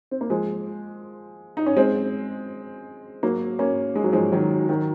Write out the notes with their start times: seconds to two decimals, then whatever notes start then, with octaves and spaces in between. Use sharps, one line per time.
0.11 C4
0.21 A#3
0.30 F3 G#3
1.57 D#4
1.66 C#4
1.77 G#3 C4
3.23 F#3 A#3
3.59 A#3 C#4
3.95 G#3
4.04 F#3
4.13 F3 G#3
4.32 D#3 F#3
4.69 D#3 F#3